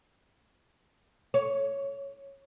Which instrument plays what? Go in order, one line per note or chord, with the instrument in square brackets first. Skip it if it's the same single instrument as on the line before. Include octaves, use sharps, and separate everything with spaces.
[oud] C#5